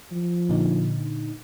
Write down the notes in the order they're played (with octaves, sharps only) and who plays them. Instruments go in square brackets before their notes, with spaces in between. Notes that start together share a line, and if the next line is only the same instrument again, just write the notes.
[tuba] F3
[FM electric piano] A#2 D3 D#4